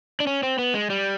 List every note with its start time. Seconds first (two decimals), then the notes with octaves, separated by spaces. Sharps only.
0.20 D4
0.27 C#4
0.43 C4
0.59 B3
0.74 G#3
0.90 G3